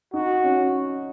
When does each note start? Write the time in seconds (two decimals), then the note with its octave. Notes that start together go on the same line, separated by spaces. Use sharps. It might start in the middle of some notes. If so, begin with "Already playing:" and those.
0.14 D#4 F#4
0.44 C#4